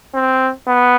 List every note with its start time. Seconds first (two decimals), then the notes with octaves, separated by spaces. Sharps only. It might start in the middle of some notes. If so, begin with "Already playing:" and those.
0.15 C4
0.68 B3